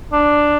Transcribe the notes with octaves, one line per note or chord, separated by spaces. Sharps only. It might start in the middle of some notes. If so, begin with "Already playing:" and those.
D4